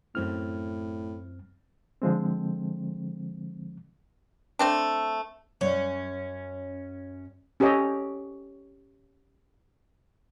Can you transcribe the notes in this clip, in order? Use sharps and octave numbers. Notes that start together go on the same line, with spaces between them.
F#2 A2 C4 F6
D3 F3 G#3 C4
A3 C4 D4
F#2 C#4
C#4 G4 A4 C#5 D#5